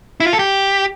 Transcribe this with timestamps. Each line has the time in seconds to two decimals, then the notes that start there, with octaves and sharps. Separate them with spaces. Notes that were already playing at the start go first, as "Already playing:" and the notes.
0.20 E4
0.27 F4
0.33 A4
0.39 G4